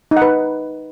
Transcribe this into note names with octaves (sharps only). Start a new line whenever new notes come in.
D#4
F#5
B4